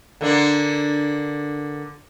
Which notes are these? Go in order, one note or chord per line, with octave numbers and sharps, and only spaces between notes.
D3 A#3 D4